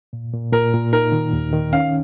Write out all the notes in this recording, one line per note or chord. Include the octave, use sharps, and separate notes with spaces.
A#2
A#2
A#2 A#4
A#2
D#4 A#4
D#3
D#2
D#3
C#4 F5